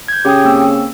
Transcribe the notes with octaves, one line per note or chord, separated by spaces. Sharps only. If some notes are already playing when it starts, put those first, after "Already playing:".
G6 G#6
C#3 G4 G5 D#6
A#3 C4 E6